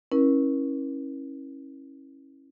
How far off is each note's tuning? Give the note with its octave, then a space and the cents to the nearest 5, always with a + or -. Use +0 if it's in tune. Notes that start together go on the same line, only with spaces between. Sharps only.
C#4 -25 E4 -25 A#4 +40